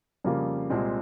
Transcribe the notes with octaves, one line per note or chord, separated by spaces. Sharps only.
F2 C#3 G3 A#3 F4
C2 A#2 G#3 C4